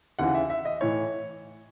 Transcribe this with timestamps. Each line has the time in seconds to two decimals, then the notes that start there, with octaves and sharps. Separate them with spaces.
0.19 D#2 C#3 E3 F#5
0.35 E5
0.50 E5
0.65 D#5
0.81 A2 E3 C#5